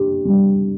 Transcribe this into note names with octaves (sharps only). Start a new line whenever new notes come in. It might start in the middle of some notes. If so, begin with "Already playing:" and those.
Already playing: D4 G4
G3